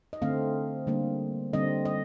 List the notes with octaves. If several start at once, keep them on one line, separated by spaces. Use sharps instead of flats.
D#5
D3 A3 C4 F5
D3 G3 A#3
D3 G3 C4 D#5
D#5